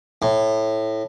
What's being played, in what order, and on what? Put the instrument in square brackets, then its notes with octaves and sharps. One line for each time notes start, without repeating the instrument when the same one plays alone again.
[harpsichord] A2